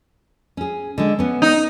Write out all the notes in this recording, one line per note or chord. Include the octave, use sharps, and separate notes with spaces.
C#4 G#4
D3 G#3
B3 C#4
D#4